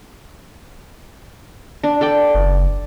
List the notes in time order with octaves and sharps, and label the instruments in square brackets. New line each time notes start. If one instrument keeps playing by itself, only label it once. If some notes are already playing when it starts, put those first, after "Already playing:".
[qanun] D4
A4 D5 G5
[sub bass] F#1